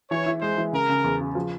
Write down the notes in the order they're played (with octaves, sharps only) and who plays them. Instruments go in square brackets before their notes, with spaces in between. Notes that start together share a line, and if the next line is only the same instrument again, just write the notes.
[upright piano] E3 [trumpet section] C#5
[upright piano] E4
[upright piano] G#3 [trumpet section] C5
[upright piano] E3
[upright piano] C#3 [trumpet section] A#4
[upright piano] C#3
E2
C#3
F3